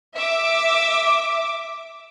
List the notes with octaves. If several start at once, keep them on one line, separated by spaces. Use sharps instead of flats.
E5 D6